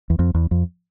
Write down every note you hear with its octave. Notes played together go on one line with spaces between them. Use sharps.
E2
F2
E2
F2